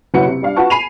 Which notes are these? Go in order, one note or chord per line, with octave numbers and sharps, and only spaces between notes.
F#1 F#3 E4 F#4 B4 C#7
C3
G3 D4 F5
F4 F#4 B4 F#5 A5 C#6
G#5 B5 C7 D#7 F7